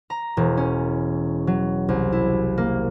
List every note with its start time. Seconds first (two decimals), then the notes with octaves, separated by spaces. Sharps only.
0.10 A#5
0.37 E1
0.57 C#4
1.47 F#3
1.88 C2
2.12 E4
2.58 A#3